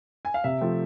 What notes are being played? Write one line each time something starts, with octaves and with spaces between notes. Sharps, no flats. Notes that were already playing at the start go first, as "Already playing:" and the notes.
G#5
F5
C3 E5
F3 A3 C4